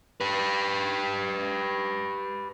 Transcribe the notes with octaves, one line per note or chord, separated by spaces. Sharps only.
G4 B4